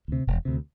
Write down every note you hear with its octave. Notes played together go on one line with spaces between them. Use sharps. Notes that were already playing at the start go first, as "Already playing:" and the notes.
D2 C3
E1
D2 C3